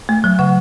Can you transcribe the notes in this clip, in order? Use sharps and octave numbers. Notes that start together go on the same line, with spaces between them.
A3
F#3
C#3 F#5